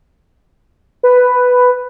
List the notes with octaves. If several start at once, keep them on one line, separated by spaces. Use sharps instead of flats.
B4